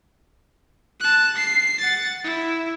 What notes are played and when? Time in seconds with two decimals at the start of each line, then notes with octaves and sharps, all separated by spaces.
1.00 A5 F#6
1.35 C7
1.79 F#5 A6
2.24 E4